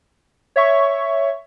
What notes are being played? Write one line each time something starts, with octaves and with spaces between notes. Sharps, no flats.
C#5 E5 C#6